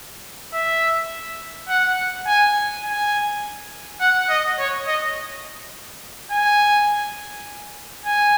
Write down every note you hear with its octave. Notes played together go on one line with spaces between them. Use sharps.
E5
F#5
G#5
G#5
F#5
D#5
C#5
D#5
G#5
G#5